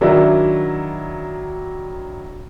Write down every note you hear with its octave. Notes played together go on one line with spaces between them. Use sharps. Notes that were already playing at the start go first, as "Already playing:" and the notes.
D#3 F#3 D4 E4